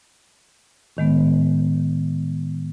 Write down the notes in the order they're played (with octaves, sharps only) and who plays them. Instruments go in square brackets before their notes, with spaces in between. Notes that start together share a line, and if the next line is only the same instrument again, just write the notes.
[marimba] A2 D#3 G#3 B3